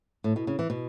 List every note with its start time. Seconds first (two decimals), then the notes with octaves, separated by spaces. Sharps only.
0.24 A2
0.36 B2
0.47 C#3
0.59 E3
0.70 B2